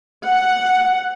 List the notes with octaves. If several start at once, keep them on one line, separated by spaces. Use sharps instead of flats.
F#5